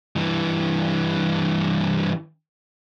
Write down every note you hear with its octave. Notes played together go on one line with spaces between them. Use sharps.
G2 E3